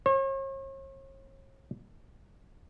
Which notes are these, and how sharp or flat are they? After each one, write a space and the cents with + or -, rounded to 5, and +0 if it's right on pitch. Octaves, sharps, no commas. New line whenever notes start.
C#5 -45